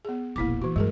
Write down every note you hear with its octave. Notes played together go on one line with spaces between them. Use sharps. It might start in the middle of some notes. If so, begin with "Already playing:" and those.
B3 G#4
E1 A#1 A#3 E4 D6
E3 F#4
G2 G#3 G#4 A#4